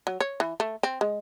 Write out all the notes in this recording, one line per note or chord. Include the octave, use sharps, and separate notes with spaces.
F#3
C#5
E3
A3
C4
G#3